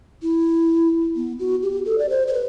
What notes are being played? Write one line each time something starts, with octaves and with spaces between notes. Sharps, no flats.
E4
B3
F#4
G4
A4
D5
C5
C5
B4